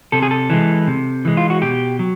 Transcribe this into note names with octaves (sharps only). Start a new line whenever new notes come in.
C3 A4
G#4
A4
E3 G#3
C3
E3 G#3
F4
F#4
B2 G4
F#3